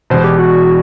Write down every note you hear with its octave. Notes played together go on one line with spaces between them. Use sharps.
E1 E2 B2 C5
G4
F#4